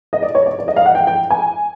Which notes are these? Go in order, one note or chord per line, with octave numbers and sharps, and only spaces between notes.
D#5
D5
C#5
D5
D5
D#5
F5
F#5
G5
G5
G#5